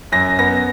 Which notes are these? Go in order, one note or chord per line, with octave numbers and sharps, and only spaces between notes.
F#2 A#6
B3 A#6